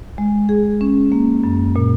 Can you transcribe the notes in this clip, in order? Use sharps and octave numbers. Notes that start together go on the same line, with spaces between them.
G#3
G#4
C#4
A#3
F#2
A#2